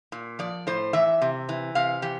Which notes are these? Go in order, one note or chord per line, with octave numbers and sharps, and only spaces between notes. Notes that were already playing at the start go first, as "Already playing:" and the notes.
A#2
F3 D5
A2 C5
E3 E5
C3
E3
C3 F5
E3 G4